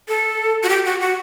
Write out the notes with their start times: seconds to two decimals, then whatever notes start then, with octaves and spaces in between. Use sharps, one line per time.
0.08 A4
0.63 F#4
0.69 G4
0.85 F#4
1.01 F#4